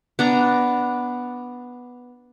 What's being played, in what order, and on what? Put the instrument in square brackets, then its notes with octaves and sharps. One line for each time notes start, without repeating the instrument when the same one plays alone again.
[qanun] B3 D4 A#5